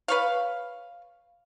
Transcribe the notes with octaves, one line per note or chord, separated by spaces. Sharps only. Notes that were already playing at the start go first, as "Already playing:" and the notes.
B4 C#5 F5